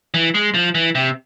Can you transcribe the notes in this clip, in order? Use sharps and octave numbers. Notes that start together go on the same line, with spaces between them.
E3
G#3
F3
E3
C3